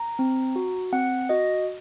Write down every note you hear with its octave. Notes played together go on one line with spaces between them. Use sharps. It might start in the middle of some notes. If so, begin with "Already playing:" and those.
Already playing: A#5
C4
F#4
C4 F#5
F#4 D#5